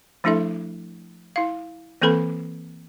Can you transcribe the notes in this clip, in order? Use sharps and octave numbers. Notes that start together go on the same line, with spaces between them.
F3 A3 D4 E4 A4 E5
E4 F5
E3 A#3 C4 A4 B4 B5